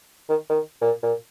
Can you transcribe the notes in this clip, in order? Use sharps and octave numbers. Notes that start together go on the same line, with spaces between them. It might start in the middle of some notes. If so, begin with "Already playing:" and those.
D#3
D#3
A#2
A#2